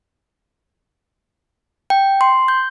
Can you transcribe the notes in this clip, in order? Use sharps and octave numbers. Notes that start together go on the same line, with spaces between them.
G5
C6
G6